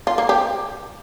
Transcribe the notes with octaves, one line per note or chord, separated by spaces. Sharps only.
F4
A#3
G4